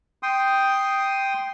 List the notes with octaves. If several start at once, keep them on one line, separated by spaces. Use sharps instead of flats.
G5 C6 D#6